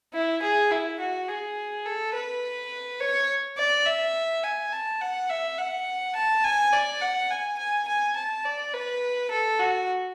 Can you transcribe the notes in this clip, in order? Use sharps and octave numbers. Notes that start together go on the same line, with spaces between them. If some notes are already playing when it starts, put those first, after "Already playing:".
E4
G#4
E4
F#4
G#4
A4
B4
C#5
D5
E5
G#5
A5
F#5
E5
F#5
A5
G#5
D5
F#5
G#5
G#5
G#5
A5
D5
B4
A4
F#4